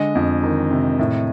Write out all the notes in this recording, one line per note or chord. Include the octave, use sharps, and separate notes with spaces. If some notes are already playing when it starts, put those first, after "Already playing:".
Already playing: D3 G#3 D#5
F2
D#3
C3
A2